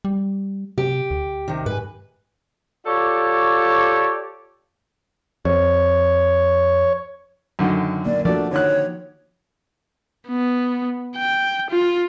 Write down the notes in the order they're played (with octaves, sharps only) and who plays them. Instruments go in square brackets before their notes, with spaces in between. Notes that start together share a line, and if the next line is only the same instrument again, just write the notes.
[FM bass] G3
[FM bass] C3 [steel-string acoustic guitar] G4
[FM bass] D2
[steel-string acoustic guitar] C3 D#3
[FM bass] G#2 [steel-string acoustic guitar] B4 G#5
[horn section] F4 G4 A4 C#5 D5
[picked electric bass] F2 [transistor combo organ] C#5
[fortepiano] F#2 D3 D#3
[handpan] A#3 [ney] D5
[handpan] F3 F#4 [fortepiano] A3 D5 [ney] D4
[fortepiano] D3 D#3 F#6 [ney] C#5
[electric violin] B3
G5
F4